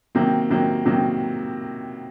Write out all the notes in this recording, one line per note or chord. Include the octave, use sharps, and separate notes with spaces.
C3 D#3 F#3 A#3
C3 D#3 F#3 A#3
C3 D#3 F#3 A#3